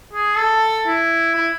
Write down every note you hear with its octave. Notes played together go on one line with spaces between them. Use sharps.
G#4
A4
E4
E4